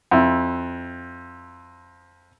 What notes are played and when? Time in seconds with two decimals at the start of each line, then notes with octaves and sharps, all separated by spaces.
0.11 F2 E4